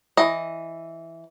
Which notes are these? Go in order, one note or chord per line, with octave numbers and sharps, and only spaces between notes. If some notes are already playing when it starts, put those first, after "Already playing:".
E3 D#5